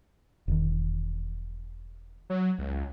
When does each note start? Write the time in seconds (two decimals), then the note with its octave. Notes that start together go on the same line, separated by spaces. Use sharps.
0.48 E1 D#3
2.30 F#3
2.59 C#2